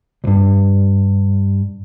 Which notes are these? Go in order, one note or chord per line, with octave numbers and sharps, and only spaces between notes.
C2 G2